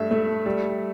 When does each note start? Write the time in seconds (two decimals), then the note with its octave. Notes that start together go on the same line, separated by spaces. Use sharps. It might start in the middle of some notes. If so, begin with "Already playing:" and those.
Already playing: G2 A3 E5
0.11 A3
0.46 G3